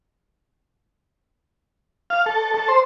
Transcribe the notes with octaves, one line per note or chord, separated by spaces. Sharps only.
F5
A4
A4
C5